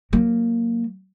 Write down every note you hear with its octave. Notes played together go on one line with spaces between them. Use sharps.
F#3 A#3